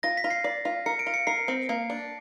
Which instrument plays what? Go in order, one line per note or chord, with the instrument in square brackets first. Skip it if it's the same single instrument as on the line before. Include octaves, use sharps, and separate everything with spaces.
[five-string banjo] F4 [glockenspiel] A#6
[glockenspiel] B6
[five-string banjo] F4
[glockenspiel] C7
[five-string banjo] D5
F4
[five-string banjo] A#4 [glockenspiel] C#7
[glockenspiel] D7
[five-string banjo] F4
[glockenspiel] C#7
[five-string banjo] A#4 [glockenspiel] C7
[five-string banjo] C4
A#3
D4